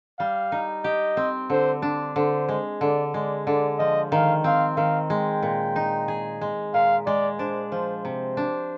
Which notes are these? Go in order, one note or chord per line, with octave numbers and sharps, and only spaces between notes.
G3 F5
D#4
G4 D#5
C4
D3 C5
D4
D3 C5
G#3
D3 D5
G#3 D5
D3 D5
F3 D#5
D#3 F5
C4 F5
D#3 F5
G#3 G5
A#2
D#4
G#4
G#3
A#2 F5
G#3 D5
D4 C5
F3 C5
C3 C5
D4